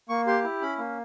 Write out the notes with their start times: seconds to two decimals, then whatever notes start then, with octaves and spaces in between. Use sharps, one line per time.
0.09 A#3 C#6
0.27 G4 C6
0.44 E4
0.62 C#4 B5
0.78 A#3